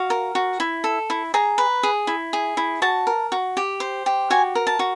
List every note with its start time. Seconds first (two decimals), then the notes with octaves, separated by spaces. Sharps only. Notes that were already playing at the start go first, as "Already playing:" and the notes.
Already playing: F#4 F5
0.10 A#4
0.35 F#4
0.60 E4
0.84 A4
1.10 E4
1.34 G#4 A#5
1.58 B4
1.83 G#4
2.07 E4
2.33 G#4
2.57 E4
2.82 F#4 A5
3.07 A#4
3.32 F#4
3.57 G4
3.80 C5
4.06 G4
4.30 F#4 G#5
4.55 A#4
4.67 A5
4.79 F#4